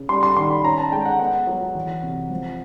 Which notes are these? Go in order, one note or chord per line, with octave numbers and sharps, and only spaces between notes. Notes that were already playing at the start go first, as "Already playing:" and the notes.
Already playing: C#3
G3 C6
C6
D#3 C6
B5
C#4 A#5
A5
G#3 G5
F#5
B3 F#5
F#3
E3
C3
F3